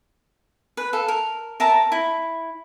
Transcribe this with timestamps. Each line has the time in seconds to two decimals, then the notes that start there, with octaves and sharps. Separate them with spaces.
0.77 B4
0.93 A4 F5
1.08 A#4
1.60 A#4 E5 A5 A#5
1.92 E4